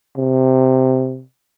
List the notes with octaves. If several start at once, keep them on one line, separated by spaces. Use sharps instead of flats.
C3